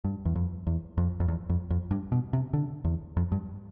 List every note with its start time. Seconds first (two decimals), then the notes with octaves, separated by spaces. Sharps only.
0.04 G2
0.25 E2
0.35 F2
0.67 E2
0.98 F2
1.20 F2
1.28 E2
1.49 F2
1.70 F2
1.91 G2
2.12 B2
2.33 C3
2.53 D3
2.85 E2
3.17 F2
3.32 G2